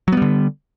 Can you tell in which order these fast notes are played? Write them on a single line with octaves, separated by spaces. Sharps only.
F#3 B3 G3 D3